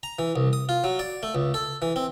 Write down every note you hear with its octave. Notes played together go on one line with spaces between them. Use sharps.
A#5
E3
C2
D#6
F4
F#3
D5
A3
C#2
A4
E3
C4